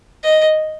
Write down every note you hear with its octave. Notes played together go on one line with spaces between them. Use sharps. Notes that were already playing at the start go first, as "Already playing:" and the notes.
D#5